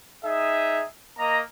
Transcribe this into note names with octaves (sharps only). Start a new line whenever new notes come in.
D#4 G#4 E5
A#3 D#5 A#5